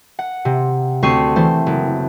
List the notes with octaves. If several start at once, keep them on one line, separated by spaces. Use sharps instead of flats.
F#5
C3
D2 C4 C#6 C7 D#7
E3 A3 C5
F#1